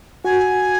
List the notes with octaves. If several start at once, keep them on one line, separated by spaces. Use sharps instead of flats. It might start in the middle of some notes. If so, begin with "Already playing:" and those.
F#4 G#5